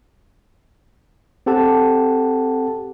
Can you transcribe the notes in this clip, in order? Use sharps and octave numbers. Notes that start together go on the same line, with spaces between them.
C4 G4 A4 F#5 A5